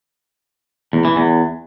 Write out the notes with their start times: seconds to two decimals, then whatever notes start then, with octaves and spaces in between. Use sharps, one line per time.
0.93 E2
1.05 E3
1.16 E2